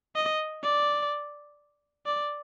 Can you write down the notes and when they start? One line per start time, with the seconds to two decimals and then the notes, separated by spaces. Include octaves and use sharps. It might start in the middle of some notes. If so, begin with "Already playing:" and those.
0.16 D#5
0.63 D5
2.06 D5